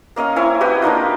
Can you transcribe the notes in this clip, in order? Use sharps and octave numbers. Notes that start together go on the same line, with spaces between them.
A#3 C#4 D#5 F5
C4 E4 C#5 G#5
F#4 G4 B4 D#5
A#3 D4 D#4 F4